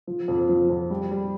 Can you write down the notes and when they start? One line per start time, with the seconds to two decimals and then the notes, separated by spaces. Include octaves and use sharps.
0.07 F3
0.28 F2
0.49 F3
0.69 F2
0.90 G3
1.11 G3